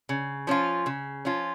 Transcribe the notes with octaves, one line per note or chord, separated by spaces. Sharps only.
C#3
F3 C#4 F4
C#3
F3 C#4 F4